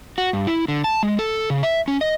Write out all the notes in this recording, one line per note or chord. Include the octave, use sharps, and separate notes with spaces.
F#4
G2
E4
D3
A5
G#3
A4
C#3
E5
C#4
D#5